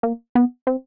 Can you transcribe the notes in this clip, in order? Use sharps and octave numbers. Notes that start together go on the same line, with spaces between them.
A#3
B3
C4